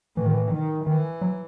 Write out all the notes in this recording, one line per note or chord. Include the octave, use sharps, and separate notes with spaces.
A2 E3
D#3
E3
D#3
D#3 E3
F#3